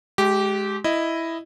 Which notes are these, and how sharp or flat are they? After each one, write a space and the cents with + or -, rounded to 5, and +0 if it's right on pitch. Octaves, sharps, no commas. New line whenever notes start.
G#3 +25 G4 -15
E4 +0 D#5 +0